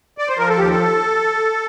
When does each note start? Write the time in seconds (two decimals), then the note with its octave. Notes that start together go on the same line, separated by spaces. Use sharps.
0.18 D5
0.28 C5
0.37 F3 A#4
0.49 A4
0.58 D#2 G4
0.69 A4